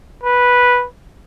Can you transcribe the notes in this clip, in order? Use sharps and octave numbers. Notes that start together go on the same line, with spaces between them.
B4